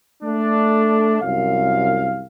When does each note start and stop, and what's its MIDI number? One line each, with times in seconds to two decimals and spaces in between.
0.23 1.20 57
0.23 1.20 62
1.22 2.25 36
1.22 2.25 42
1.22 2.25 77